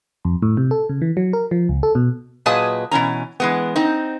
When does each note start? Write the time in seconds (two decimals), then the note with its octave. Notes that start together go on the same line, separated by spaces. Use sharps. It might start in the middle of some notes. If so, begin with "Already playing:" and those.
0.25 F2
0.42 A2
0.57 C3
0.71 A4
0.89 C#3
1.02 E3
1.17 F#3
1.33 A#4
1.51 F3
1.69 C#2
1.83 A4
1.95 B2
2.46 A#2 F#3 G#4 B4 D#5 A5
2.91 B2 E3 C#4 A#5
3.40 E3 G#3 B3
3.76 C4 D#4